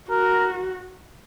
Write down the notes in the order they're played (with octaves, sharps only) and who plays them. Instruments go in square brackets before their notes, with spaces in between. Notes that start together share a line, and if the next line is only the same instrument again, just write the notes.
[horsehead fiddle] F#4 [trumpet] A#4